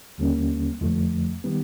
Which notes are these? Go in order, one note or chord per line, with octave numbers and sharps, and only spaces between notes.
D#2 D3 G3 A#3 C#4
F2 D3 F3 A3
D#3 G3 B3